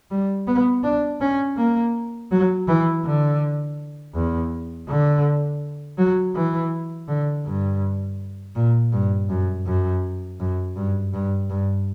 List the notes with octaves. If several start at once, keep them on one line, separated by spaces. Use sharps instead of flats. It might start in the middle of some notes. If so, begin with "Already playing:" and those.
G3
B3
D4
C#4
A#3
F#3
E3
D3
E2
D3
F#3
E3
D3
G2
A#2
G2
F#2
F#2
F#2
G2
G2
G2